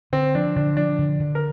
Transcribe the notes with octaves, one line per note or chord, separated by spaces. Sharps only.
D3 C4
F3 D4
D3 D4
F3 D4
D3
D3
A#4